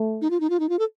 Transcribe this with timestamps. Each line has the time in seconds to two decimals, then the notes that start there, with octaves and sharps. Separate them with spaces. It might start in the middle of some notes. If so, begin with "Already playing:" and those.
Already playing: A3
0.21 D#4
0.31 F4
0.40 D#4
0.50 F4
0.60 D#4
0.69 F4
0.79 A4